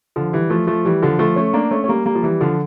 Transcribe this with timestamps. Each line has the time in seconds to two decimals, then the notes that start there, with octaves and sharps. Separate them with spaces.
0.16 D3 F3
0.33 E3 G3
0.50 F3 A3
0.67 F3 A3
0.85 E3 G3
1.02 D3 F3
1.19 F3 A3
1.36 A3 C#4
1.54 A#3 D4
1.71 A3 C#4
1.84 C#4
1.88 G3 A#3
2.05 G3 A#3
2.15 F3
2.23 E3 G3
2.41 D3 F3